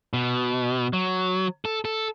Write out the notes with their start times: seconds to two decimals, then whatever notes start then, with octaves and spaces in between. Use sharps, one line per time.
0.14 B2
0.93 F#3
1.65 A4
1.85 A4